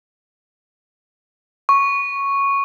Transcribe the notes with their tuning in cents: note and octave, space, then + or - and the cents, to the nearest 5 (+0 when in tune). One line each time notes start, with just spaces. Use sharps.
C#6 +0